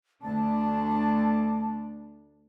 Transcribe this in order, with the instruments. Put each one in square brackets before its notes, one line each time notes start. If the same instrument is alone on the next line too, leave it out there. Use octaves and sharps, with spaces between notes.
[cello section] D2 D4 [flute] A5